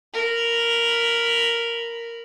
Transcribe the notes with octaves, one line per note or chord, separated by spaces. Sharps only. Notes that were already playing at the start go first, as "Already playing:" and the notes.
A#4 B5